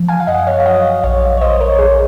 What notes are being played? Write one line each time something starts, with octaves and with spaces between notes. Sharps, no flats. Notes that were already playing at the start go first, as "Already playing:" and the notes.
Already playing: F3
F5 G#5
F5
F#2 D#5 F#5
C#5 F5
F5
F#3 D#5 F#5
A#1 C#5 F5
C#5
A#1 C5 D#5
A#4 C#5
A#1 G#4